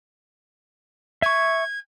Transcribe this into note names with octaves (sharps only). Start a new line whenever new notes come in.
E5 C#6 G#6